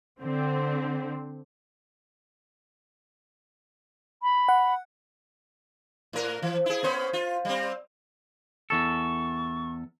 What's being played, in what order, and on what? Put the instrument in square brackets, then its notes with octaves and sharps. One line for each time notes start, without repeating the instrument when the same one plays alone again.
[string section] D3 C4
[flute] B5
[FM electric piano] F#5
[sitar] A2 A#4
E3
E4 G#4
B3 C#4 C5
F4
G3 C4
[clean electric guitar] E2 A4 [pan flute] C#6